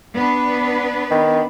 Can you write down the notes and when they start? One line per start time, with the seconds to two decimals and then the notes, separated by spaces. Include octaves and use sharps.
0.15 B3 D4 B4
1.11 D#3